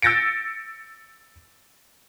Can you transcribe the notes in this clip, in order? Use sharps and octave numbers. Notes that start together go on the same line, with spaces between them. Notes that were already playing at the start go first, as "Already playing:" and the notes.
E6 G6 A6 A#6 C#7 D7